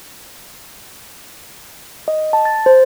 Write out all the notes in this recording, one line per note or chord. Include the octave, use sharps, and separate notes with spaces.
D#5
A5
A6
C5